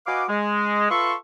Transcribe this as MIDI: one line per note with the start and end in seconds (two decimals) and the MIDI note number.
0.07 0.24 66
0.07 0.24 71
0.07 0.24 75
0.07 0.24 77
0.07 0.24 80
0.07 0.24 86
0.29 0.89 56
0.90 1.14 65
0.90 1.14 69
0.90 1.14 71
0.90 1.14 76
0.90 1.14 84
0.90 1.14 85